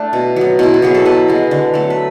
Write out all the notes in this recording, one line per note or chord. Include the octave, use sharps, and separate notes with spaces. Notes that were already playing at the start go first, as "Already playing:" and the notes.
Already playing: A3 D4
B2
F#3 B3
B2 E4
F#4
F#3 B3 G#4
A4
B2 B4
G#3 B3
D3
F#3 A3
B4